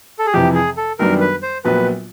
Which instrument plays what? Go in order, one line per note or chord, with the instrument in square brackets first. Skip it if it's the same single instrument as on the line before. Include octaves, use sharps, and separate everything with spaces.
[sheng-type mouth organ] A4
G#4
[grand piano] F2 C3 E3 [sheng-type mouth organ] G4
[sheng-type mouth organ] G#4
A4
[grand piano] F#2 D#3 G3 B3 D4 [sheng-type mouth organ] A#4
[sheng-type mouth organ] B4
C5
[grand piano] A#1 A#2 F#3 B3 [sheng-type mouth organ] B4